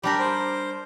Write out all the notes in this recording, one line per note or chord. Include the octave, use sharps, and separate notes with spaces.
G3 D4 G4 A#4
C5